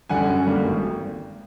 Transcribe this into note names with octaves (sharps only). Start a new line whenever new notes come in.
F#2 D3 G3 F#5 G#5
F#2
D3 G3 A#3
G#1